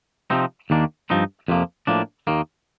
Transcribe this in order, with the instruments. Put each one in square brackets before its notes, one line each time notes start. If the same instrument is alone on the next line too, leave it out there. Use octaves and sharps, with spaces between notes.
[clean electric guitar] C3 F3 C4 D#4
D#2 D#3 A#3 D4
G2 F3 C4 D#4
F2 C3 F3 A#3
A2 F3 A#3 D4
D#2 D#3 A#3